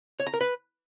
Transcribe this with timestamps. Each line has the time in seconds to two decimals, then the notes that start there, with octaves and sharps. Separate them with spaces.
0.20 C#5
0.27 A#5
0.34 A#4
0.41 B4